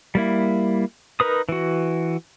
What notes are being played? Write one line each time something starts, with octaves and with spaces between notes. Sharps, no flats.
G3 A#3 E4
D#4 A#4 B4 D#6
E3 F#4